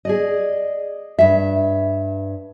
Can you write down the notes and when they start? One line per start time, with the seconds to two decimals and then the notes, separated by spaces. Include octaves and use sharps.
0.05 G#4 D5 D#5
1.19 G2 E5